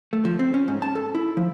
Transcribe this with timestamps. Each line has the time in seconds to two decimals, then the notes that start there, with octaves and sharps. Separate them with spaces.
0.13 A3
0.25 F3
0.39 C4
0.54 C#4
0.68 G#2
0.82 A5
0.95 A4
1.15 E4
1.37 F3